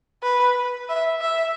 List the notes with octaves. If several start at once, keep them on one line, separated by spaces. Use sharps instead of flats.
B4
E5
E5